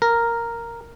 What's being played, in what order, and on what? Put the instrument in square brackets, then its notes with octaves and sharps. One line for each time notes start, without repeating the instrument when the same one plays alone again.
[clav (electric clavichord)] A#4